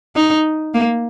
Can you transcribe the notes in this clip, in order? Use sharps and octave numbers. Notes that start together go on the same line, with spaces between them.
D#4
A#3